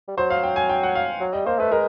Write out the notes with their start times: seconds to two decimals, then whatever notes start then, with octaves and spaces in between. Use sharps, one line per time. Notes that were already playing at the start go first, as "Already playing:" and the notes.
0.08 G3
0.18 F#3 C5
0.30 F5
0.43 G5
0.56 G#5
0.69 G5
0.83 F#5
0.95 F5
1.20 F#3
1.33 G3 D#5
1.46 A#3 C5
1.59 A3 B4
1.72 G#3 A#4